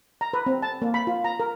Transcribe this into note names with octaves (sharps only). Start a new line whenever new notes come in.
A#5
B4
C4
A5
A#3
B5
F4
A#5
A#4